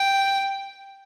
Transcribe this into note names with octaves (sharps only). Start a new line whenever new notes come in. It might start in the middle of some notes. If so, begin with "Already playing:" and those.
Already playing: G5